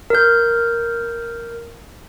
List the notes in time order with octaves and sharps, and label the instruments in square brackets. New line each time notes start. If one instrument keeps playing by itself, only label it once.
[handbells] A#4 G6